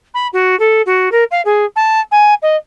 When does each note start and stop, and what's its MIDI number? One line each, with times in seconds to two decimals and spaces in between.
0.14 0.27 83
0.33 0.58 66
0.59 0.81 69
0.86 1.11 66
1.11 1.24 70
1.31 1.41 77
1.45 1.65 68
1.76 2.00 81
2.11 2.34 80
2.42 2.56 75